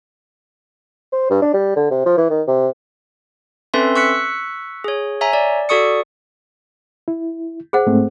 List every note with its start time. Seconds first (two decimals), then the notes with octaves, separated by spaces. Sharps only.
1.12 C5
1.30 G2
1.42 D4
1.54 G3
1.76 D3
1.91 C3
2.05 F3
2.17 E3
2.30 D#3
2.47 C3
3.74 C4 C#4 A4 B4 E5 C6
3.96 C#6 E6 F#6 B6 C#7
4.84 G#4 C#5
5.21 C#5 E5 G#5 A#5
5.33 D5
5.69 F#4 A4 D5 C#6 D#6 C#7
7.08 E4
7.73 G#4 C5 F#5
7.87 G#2 A3 C4